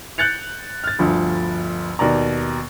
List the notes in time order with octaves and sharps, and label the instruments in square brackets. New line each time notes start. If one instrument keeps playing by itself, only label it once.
[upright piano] F#6 G6 A6 C#7 F7
F6 A6
G1 D2 F3
D#2 B2 D5 A#5